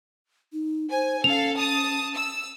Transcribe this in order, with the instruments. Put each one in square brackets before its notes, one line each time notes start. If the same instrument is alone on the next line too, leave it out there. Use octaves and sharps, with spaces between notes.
[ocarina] D#4
[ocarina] C5 [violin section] G#5
[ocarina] C#4 [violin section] A4 F5 [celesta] F7
[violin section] A5 D#6
E6